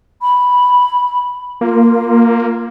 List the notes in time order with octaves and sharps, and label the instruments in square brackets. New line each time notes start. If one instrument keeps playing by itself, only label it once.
[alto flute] B5
[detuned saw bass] A#3 [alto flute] F4